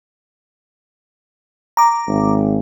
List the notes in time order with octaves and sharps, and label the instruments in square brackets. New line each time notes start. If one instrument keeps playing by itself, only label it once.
[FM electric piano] A#5 D6
[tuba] G#1